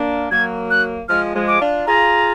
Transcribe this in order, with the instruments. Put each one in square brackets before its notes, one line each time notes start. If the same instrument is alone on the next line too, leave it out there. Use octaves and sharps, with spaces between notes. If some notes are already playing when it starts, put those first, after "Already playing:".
Already playing: [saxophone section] A#3 D4
[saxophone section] F#3 A#3 [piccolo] G#6
[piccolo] F#6
[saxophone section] F3 G#3 [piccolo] F6
[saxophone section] F3 G#3
[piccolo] D6
[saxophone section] D4 F4
[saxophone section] F4 G#4 [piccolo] A#5